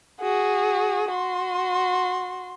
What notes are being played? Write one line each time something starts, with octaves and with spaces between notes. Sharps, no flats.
F#4 G#4
F#4 C6